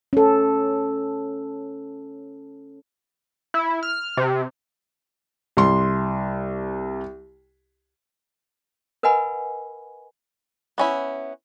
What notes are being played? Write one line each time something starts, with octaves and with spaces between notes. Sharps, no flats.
C#4 A4
E4
F6
C3
C2 C6
A#4 B4 D#5 F#5 G#5 B5
B3 C#4 E4